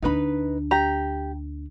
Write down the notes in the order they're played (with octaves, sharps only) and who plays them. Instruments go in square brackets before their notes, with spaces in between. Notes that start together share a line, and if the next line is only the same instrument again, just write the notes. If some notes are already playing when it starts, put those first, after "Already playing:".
[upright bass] D2 D4 [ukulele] D#4 B4 B5
[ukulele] G4 A#5